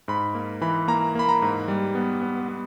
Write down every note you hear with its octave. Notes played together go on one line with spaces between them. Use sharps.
G#2 B5
A#3
E3 B5
A#3 A#5
A#3 B5
A#5
G#2
G3
B3
B3
B3